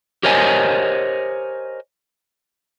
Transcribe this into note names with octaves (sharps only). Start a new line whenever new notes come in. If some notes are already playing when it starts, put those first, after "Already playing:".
G4 A#4 C5 C#5 D#5 G#5